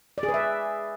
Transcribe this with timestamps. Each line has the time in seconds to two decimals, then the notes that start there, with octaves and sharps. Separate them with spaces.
0.18 D5
0.23 G#4
0.29 B4
0.34 E5